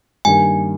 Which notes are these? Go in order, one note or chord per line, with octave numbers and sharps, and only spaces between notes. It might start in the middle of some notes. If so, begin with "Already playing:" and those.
G2 D#3 G3 A#3 G#5